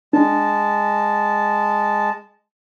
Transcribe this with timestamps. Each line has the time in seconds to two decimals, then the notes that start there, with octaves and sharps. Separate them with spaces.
0.13 G#3 D4 A5